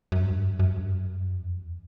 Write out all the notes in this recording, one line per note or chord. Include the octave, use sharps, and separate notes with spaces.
F#2
G2
F#2
G2
F#2
G2
F#2
F2
E2